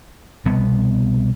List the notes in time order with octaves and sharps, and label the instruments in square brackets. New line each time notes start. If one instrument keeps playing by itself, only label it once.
[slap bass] C2 B2 G3 B3